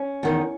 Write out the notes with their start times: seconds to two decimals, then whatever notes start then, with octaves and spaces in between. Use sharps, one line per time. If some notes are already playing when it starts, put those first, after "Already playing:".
Already playing: C#4
0.23 E2 D#3